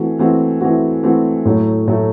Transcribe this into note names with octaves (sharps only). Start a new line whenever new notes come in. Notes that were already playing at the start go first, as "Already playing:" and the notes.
Already playing: E3 A3 C4 F#4
E3 A3 C4 F#4
E3 A3 C4 F#4
E3 A3 C4 F#4
A2 F#3 A3
A2 F#3 A3